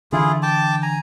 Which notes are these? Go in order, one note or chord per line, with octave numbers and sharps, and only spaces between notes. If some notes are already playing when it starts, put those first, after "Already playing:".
D3 E3 D4 E4 F4 G#4
G5 A5 D6
G#5 A#5